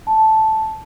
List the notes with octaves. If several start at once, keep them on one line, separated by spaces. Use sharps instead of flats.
A5